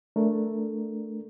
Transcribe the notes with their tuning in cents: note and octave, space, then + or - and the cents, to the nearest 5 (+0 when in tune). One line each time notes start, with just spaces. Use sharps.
A3 +0 D4 +0 A#4 +0